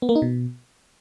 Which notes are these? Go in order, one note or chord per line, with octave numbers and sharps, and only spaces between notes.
B3
A#3
D#4
B2